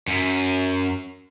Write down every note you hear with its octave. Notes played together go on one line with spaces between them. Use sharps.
F#2